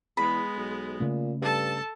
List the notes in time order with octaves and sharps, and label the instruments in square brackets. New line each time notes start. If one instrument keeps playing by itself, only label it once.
[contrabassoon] E2 [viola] G#3 B3 [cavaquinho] B5
[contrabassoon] B1
[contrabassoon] A#2 [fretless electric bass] C#3 A3 C#4
[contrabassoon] G2 [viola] A4 A5